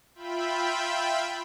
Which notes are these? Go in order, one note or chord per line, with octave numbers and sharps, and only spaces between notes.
F4 E5 G5 B5